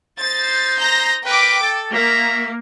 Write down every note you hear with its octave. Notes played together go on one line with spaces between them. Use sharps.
D#4 C5 A6
A#5 G6 A#6
A#4 B4 G5 D6
A4
A#3 F#4 E5 A#5